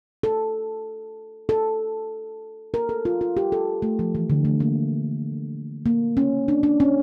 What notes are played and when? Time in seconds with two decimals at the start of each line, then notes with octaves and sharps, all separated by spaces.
0.23 A4
1.49 A4
2.74 A#4
2.89 A4
3.05 F4
3.21 F4
3.37 G4
3.52 A4
3.82 A3
3.99 F3
4.15 E3
4.30 D3
4.45 A3
4.60 A#3
5.86 A#3
6.17 C#4
6.48 D4
6.63 D4
6.80 C#4